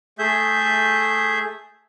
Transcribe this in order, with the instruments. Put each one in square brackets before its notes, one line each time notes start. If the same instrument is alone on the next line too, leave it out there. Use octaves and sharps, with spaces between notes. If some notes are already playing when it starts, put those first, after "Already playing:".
[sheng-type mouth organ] A3 G#4 E5 G6